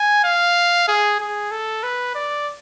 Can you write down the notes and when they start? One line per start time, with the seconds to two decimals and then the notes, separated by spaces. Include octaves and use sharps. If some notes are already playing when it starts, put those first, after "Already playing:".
Already playing: G#5
0.24 F5
0.88 G#4
1.19 G#4
1.51 A4
1.83 B4
2.15 D5